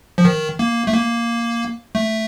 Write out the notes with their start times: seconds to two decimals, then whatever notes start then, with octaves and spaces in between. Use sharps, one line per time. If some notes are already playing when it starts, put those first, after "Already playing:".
0.18 F3
0.25 D#3
0.59 A#3
0.87 A3
0.93 A#3
1.95 A3